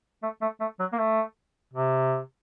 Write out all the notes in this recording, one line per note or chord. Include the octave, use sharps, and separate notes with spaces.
A3
A3
A3
F#3
A#3
A3
C3